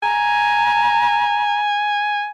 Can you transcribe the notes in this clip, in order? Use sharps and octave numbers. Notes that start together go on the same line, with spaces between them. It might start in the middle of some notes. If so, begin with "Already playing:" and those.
G#5 A#5